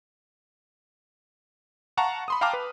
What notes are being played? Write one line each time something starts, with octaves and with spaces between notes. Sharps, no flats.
F5 F#5 A5 A#5 C#6
B5 C6 D#6
F5 G5 A5 A#5 D6 F6
B4